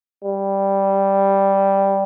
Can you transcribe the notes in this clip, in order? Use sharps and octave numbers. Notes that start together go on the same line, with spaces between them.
G3